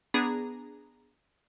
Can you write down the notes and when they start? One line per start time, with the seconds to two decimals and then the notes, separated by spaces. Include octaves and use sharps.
0.14 B3 D4 G#4 A#5